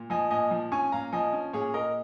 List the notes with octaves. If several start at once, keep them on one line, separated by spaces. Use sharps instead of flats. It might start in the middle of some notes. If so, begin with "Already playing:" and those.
Already playing: A#2
F3 D#5 G#5
A#2 D#5 G#5
F3
C#4 G#5 C#6
A#2 F5 A#5
F3 D#5 G#5
C#4
A#2 G#4 C#5
A#2 A#4 D#5